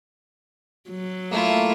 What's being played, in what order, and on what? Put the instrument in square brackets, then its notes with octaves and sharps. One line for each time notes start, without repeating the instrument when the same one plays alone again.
[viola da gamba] F#3
[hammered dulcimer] A3 A#3 [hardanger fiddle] E4 F4